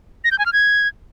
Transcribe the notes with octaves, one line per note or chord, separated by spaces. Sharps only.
A#6
G6
G#5
F6
G#6